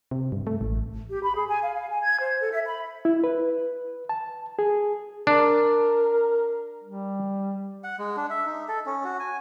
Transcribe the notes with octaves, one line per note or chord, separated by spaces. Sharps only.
C3
G2
A3
A1
G4
B5
G#4
G#5
F5
F5
G#5
G#6
C5
A4
E5
B5
E4
B4
A5
G#4
D4 A#4
G3
F#5
G#3
D4
E5
D#4
A4
C#4
F#4
G#5